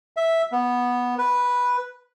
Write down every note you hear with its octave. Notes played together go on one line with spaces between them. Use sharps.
E5
B3
B4